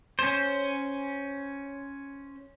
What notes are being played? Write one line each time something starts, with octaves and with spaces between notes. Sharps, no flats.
C#4 C5